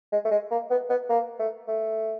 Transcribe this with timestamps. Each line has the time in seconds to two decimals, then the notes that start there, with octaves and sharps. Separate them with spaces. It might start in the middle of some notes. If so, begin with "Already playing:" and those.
0.12 G#3
0.25 A3
0.31 G#3
0.51 A#3
0.71 B3
0.90 B3
1.10 A#3
1.39 A3
1.68 A3